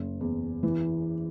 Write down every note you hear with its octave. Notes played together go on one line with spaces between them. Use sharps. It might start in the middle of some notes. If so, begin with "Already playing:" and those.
Already playing: F#1
E2
E3